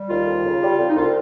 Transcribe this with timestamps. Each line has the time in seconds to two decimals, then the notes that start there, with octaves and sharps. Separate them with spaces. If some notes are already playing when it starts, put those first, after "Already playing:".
Already playing: G3
0.08 D#2 F4
0.26 F2
0.43 C#3
0.61 G3
0.78 F2
0.89 D#4
0.95 C2 F4